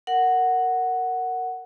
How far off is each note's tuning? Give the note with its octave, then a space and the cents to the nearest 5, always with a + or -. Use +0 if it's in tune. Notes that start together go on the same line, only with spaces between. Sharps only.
A#4 -15 F#5 +0